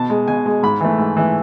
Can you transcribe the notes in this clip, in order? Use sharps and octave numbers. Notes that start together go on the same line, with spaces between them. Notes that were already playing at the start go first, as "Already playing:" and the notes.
Already playing: B2 A5
G#3
B2 G#5
G#3
G#2 B5
E3 A3
G#2
E3 A3